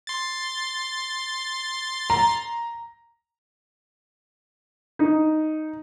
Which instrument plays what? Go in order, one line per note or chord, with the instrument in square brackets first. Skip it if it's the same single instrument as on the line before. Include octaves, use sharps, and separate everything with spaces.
[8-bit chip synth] C6 A6
[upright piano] A#5
[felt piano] D#4